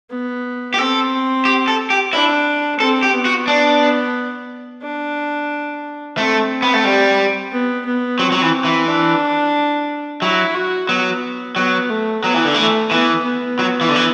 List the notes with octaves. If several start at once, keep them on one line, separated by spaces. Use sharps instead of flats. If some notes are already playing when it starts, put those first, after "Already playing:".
B3
G4
C4 A4
G4
A4
G4
D4 E4
C4 A4
G4
B3
F#4
D4
D4
A3 C4
B3
A3
G3
B3
B3
F#3 C4
F#3
E3
E3
D4
F#3 E4
F#4
F#3 B3
F#3 B3
A3
F#3 B3
E3
D3
E3 A3
E3 B3
B3
F#3
E3
D3
E3